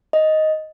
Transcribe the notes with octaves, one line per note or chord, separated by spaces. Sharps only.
D#5